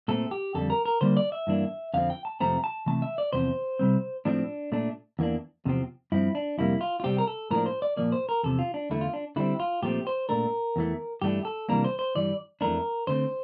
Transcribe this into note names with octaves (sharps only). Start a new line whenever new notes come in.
A#2 A3 C4 A4
G4
F2 D3 G3 A4
A#4
A#4
D3 G3 A#3 D4 C5
D5
E5
G2 E3 A#3 D4
F2 D3 F3 C4 F5
G5
A5
F2 C3 F3 A3 C4 A#5
A5
C3 E3 A3 A5
E5
D5
E2 C3 F3 C4 C5
C3 G3 C4
A2 F3 A3 C4 D4
A#2 A3 D4
E2 E3 A#3 D4
E2 C3 F3 C4
G2 F3 C4 E4
D4
F2 C3 G3 A#3 E4
F4
F4
C3 G3 C4 G4
A#4
A4
A2 F3 A#3 D4 A#4
C5
D5
A#2 F3 A#3 D5
C5
A#4
E2 C3 F3 A4
F4
D4
E2 D3 A3 E4
F4
D4
D3 G3 C4 E4
F4
A#2 F3 A3 C4 G4
C5
A#2 A3 D4 A#4
E2 E3 A3
G2 E3 A3 D4 G4
A4
C3 E3 G3 A#3 D4 A#4
C5
C5
G2 E3 G3 D5
F2 E3 A3 D4 A#4
D3 A3 C4 C5